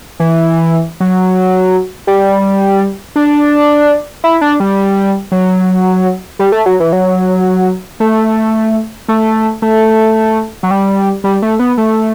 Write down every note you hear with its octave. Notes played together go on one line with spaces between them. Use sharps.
E3
F#3
G3
D4
E4
D4
G3
F#3
G3
A3
F#3
E3
F#3
A3
A3
A3
F#3
G3
G3
A3
B3
A3